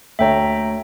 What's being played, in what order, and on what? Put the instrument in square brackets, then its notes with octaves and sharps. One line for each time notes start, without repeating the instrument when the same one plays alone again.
[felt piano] D2 C#5 [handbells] E5 G5 A#5